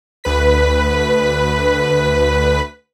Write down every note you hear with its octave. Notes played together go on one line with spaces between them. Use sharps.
D2 B4 B6